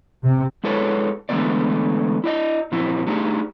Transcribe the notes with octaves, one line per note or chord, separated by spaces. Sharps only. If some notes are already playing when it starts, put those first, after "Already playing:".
C3
G#3 E4 G#4 A4 B4 C#5
D3 E3 G#3 A3 B3 D5
E4 D5 D#5
A#2 F3 C4 E4
F#3 A3 D4 D#4 G4 G#4